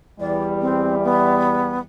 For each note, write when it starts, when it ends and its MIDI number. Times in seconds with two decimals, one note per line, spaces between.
0.20 1.85 40
0.20 1.85 52
0.20 1.85 55
0.20 0.45 74
0.61 0.96 60
1.04 1.79 59